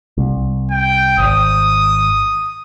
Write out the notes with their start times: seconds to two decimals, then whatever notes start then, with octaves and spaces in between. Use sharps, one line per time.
0.18 C2
0.71 G5
1.18 G#1 D#6